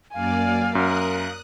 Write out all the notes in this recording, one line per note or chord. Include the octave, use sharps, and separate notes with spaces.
F#2 A#3 D5 F5 G#5
F#2 A#4 D#6 F#6